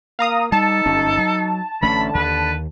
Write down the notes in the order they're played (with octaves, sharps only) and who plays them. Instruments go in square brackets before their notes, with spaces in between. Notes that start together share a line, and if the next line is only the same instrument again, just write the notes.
[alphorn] A#3 [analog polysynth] F5 A#5 D#6
[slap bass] G3 [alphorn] D#4 [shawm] A4 [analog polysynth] A5
[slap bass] G1 F#2 C#4
F#3
[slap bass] A1 A3 C#4 [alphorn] D3 [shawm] B5
[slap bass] D#2 [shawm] B4